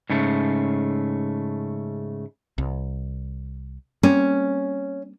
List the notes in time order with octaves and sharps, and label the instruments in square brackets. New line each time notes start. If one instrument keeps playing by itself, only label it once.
[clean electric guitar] G#2 C#3 A3
[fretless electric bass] C2
[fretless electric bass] G3 A#3 C4 [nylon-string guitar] C#4